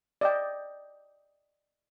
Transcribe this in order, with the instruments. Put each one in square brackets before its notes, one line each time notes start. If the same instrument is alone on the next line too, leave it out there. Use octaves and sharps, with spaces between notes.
[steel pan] D5 D#5 G5